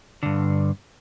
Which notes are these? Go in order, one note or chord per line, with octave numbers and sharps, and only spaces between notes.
G2 D3